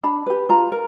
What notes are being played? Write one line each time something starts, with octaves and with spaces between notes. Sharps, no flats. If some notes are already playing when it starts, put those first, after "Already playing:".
D4 B5
G4 B4
F4 A#5
A#4